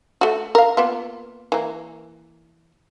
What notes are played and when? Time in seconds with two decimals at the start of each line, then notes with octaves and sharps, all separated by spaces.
0.21 A3 F#4
0.55 A#4 F5
0.77 A#3 B3 F4
1.52 E3 A#3